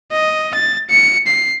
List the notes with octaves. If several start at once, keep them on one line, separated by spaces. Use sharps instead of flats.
D#5
A6
C#7
C7